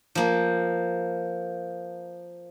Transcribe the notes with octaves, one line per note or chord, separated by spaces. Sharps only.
F3 A#3